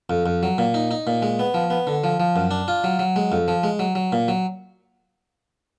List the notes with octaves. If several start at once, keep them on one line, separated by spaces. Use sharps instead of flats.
F2
F2
F#3
A#2
D#4
D#4
A#2
G#3
B3
F3
B3
D3
F3
F3
F#2
D4
F4
F#3
F#3
G#3
F2
F3
G#3
F#3
F#3
A#2
F#3